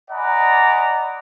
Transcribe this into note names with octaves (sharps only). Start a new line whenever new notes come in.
D5 D#5 F#5 G#5 A#5 B5